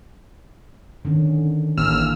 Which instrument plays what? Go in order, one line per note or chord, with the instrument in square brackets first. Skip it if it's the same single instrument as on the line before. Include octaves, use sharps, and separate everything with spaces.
[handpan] D3 D#3 C#4
[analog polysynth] A1 E6 F6 [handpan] A#3